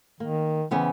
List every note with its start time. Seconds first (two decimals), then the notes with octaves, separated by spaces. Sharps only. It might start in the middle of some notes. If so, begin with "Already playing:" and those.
0.20 D#3 A#3
0.71 C#3 E3 B3 C4